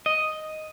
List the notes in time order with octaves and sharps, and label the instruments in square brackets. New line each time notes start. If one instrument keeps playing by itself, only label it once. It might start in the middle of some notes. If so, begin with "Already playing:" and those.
[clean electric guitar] D#5